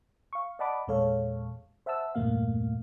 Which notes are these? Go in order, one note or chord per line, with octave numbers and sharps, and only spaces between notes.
F5 C#6
D5 D#5 F#5 A5 B5 D6
E2 A#2 G#3 A4 C#5 F5
C5 E5 F#5 A5 E6
E2 G2 A#2 A3 A#3 F5